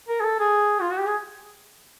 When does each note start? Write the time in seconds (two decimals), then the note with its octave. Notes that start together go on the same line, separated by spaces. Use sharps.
0.09 A#4
0.20 G#4
0.24 A4
0.40 G#4
0.81 F4
0.90 F#4
0.98 G4
1.07 G#4